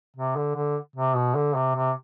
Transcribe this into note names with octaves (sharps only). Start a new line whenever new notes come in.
C3
D3
D3
C3
B2
D3
C3
C3